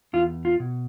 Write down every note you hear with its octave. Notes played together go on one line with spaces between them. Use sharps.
E2 F4
F4
B2